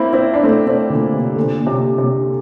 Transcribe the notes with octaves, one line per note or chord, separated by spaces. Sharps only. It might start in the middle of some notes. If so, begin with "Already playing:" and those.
Already playing: A#3 C4 E4
C4 E4
D4
A3 C4
A3 C4
A#2 D3
C3
A#2 D3
A#2
C3
C3